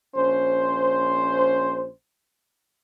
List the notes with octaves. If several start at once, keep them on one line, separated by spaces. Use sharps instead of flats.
A#1 C#4 C5